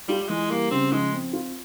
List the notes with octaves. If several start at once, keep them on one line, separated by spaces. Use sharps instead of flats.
G3 F4
G3
E3 G#3
G3 A#3
C#3 C4
F3 G#3
C4
F4